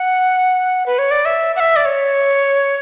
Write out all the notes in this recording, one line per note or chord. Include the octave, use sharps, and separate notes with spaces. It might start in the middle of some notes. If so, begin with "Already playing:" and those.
Already playing: F#5
B4
C#5
D5
E5
F#5
E5
D5
C#5